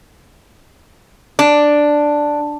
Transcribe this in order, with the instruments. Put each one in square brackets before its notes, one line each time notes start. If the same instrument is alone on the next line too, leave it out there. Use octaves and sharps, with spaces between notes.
[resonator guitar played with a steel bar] D4